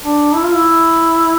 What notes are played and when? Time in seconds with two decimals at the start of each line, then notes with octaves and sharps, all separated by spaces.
0.05 D4
0.35 E4
0.44 F4
0.54 E4